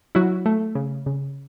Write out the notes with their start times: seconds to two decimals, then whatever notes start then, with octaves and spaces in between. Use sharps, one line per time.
0.15 F#3 E4 F#4
0.46 A3
0.75 C#3
1.06 C#3